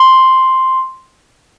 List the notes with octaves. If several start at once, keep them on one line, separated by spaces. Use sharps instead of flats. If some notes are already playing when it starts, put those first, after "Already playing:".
Already playing: C6